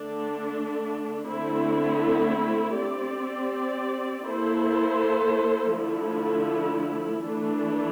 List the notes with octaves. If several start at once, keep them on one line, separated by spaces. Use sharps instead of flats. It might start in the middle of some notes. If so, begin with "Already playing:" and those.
Already playing: D3 A3 D4
D3 A3 C4 E4
C4 G4 D5
A#3 E4 A4 C5
D3 F3 A3 E4
E3 A3 D4